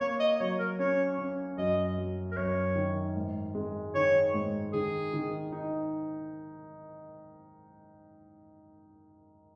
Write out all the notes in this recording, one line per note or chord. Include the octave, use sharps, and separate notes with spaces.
A#3 C#5
D#5
F#3 C#5
A#4
C#4 C#5
C#4
F#2 D#5
F#3
A#4
F#2 C#5
D#3
G#2
G#3
D#3 C#5
G#2
D#3 G#4
D#3
D#4